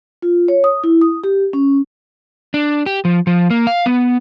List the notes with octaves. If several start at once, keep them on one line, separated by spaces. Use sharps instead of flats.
F4
C#5
D#6
E4
D#6
G4
C#4
D4
G4
F3
F3
A#3
F5
B3